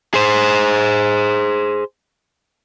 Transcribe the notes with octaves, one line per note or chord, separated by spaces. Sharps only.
G#4 C5